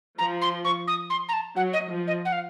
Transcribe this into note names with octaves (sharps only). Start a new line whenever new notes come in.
F3 A#5
C6
C#6
D#6
C6
A#5
A5
F#3 F#5
D#5
F3
D#5
F#5
F5